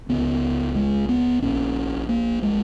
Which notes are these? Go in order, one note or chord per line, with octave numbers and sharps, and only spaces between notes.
C#2 C#3 B3
G#3
B3
A#1 A#2 C#4
A#3
G#3